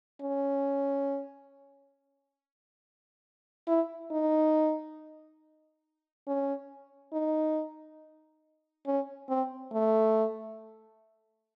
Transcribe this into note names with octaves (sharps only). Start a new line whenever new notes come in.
C#4
E4
D#4
C#4
D#4
C#4
C4
A3